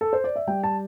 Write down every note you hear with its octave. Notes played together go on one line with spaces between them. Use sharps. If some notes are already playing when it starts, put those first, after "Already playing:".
A4
C5
D5
E5
G3 G5
A5